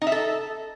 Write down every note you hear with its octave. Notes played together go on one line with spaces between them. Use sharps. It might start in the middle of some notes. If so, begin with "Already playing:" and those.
D#4
E5
A4